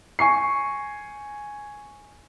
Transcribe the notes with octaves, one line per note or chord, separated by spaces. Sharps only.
G#5 C#6 C7